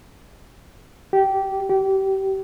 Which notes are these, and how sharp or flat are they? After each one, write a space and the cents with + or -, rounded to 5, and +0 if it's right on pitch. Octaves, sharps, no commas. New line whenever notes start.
G4 -20
G4 -30